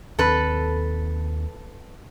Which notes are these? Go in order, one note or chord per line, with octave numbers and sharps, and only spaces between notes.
D#2 C4 A4 B4